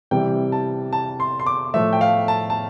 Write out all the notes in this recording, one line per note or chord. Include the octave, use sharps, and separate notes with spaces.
C3 E3 G3 G5
A5
A5
C6
C6
D6
A2 F3 A3 E5
G5
F5
A5
A5